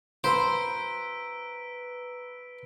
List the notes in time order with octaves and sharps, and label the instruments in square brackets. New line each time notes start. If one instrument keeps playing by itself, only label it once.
[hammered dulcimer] B4 A#5 B5 [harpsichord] C5 [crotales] E6 B6 D7